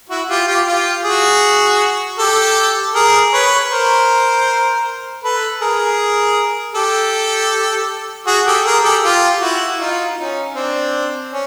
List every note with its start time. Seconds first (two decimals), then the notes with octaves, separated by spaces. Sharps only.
0.09 E4 F#4
0.29 F4 G4
0.47 F4 G4
0.66 F4 G4
1.04 F#4 G#4
2.18 G4 A4
2.94 G#4 A#4
3.33 B4 C#5
3.71 A#4 C5
5.23 A4 B4
5.61 G#4 A#4
6.75 G4 A4
8.27 F#4 G#4
8.47 G4 A4
8.65 G#4 A#4
8.84 G4 A4
9.03 F4 G4
9.41 E4 F#4
9.80 D#4 F4
10.18 C#4 D#4
10.55 C4 D4
11.31 C#4